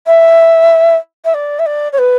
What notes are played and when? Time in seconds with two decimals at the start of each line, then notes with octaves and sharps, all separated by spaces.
0.06 E5
1.24 E5
1.34 D5
1.59 E5
1.66 D5
1.92 C#5
1.98 B4